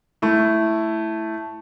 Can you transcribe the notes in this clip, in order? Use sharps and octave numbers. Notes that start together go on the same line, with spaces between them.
A3 E4